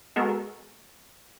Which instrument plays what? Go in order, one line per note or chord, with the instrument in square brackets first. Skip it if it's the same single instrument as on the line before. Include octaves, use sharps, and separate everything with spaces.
[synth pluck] G#3 B3 F#4 A4 A#4